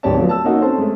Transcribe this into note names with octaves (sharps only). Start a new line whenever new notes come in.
D1 G#2 G4 C#5 D5 A5
F3 F#3 A3 B3
A5 E6
A#3 C#4 D#4 F#4
C4 C#4 A4 C5 A5
G#3 A3